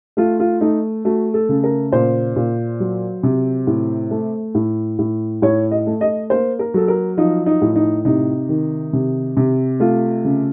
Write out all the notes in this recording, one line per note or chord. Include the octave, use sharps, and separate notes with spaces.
A3 F4
F4
A3 D#4
A3 F#4
A4
C#3
A#4
A#2 C5
A#2
F#3
C3
A2
A3
A2
A2
A2 C#5
D#5
A3
D#5
A#3 C5
A#4
F#3 A4
A#4
F3 D#4
D#4
A2
D#4
C3 D#4
D#3
C3
C3
A3 F4
C#3